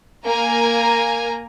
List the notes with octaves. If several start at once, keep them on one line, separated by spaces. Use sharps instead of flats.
A#3 A#4 G#5 A#5